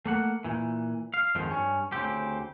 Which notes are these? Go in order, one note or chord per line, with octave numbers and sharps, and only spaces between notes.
A3 A#3 F#5
A#2 E3
F5
F2 G#2 D#3 F3
G2 C#4
D2 C#3 C4 G4